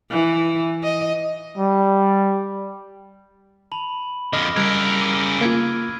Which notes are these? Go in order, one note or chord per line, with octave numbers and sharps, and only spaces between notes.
E3
D#5
G3
A5 B5 F#7
F2 D3 D#5 D6 F6 A#6
C#3 G3 A#4 E6 F#6 G#6 D7
D6 D#7
A#3 F4 F6 G#6